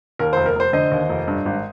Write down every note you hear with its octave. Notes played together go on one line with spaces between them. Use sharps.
D#2 A#4
F1 C5
A#4
F1 C5
D3 C5 D#5
D#2
F1
G2
G#1